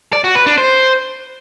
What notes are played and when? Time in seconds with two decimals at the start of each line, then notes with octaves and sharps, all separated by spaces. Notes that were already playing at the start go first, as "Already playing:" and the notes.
0.13 D5
0.24 F#4
0.35 B4
0.46 D4
0.58 C5